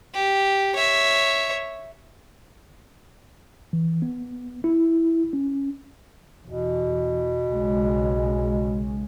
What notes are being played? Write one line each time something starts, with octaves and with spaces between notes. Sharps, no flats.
G4
C#5 E5
E3
B3
E4
C#4
E2 B2
B1 C#3 G#3